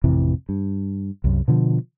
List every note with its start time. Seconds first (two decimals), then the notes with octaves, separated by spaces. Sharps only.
0.04 A1 F2 C3 E3
0.49 G2
1.24 C2 F#2
1.48 B2 D3 F3